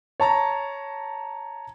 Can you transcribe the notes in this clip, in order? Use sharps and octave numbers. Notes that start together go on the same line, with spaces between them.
C#5 A5 A#5